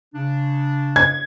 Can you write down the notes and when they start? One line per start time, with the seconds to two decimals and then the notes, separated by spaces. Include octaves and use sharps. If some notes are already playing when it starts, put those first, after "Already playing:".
0.14 C#3 D4
0.96 G#6